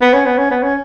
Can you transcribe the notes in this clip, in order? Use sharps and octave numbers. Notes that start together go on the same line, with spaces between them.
B3
C#4
B3
C#4
B3
C#4